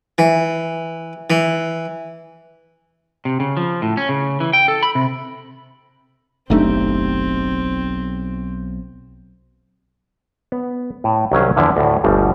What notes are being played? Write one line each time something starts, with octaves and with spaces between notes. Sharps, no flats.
E3
E3
C3
C#3
F3
A2
C#4
C#3
E3
G5
A4
B5
C3
F#1 B1 A3 C4 D4 D#4 G4
B3
A2
C2 D#3 F#3 C#4 G#4
E2 D3 F3 E4
D2 A2
G1 D2 G2 B2 G3